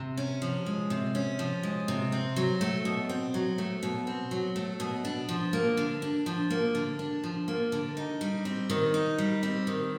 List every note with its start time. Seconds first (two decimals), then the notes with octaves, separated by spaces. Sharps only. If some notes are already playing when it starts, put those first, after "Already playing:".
Already playing: C3
0.17 C#4
0.42 F3
0.66 G#3
0.90 C3
1.15 C#4
1.39 F3
1.63 G#3
1.88 C3
2.12 C4
2.36 F#3
2.61 A3
2.85 B2
3.09 C4
3.34 F#3
3.58 A3
3.83 B2
4.07 C4
4.31 F#3
4.56 A3
4.80 B2
5.05 D4
5.29 F3
5.53 A#3
5.77 D3
6.02 D4
6.26 F3
6.50 A#3
6.75 D3
6.99 D4
7.24 F3
7.48 A#3
7.72 D3
7.97 D#4
8.21 G3
8.45 C4
8.70 D#3
8.94 D#4
9.18 G3
9.43 C4
9.67 D#3